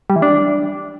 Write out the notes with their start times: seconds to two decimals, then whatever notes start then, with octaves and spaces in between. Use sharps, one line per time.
0.10 G3
0.16 E3
0.22 D4